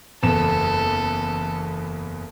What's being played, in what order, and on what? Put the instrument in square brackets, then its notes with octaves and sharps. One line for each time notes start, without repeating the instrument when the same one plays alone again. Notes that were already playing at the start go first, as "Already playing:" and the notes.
[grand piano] F#1 E2 E7 [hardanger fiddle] A4